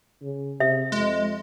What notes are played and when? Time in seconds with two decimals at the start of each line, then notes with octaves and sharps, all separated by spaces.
0.22 C#3
0.60 C3 E5
0.92 F2 G#3